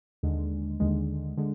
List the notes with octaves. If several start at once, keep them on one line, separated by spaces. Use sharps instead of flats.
D#2 D3 G#3
D#2 D3 G#3
D3 G#3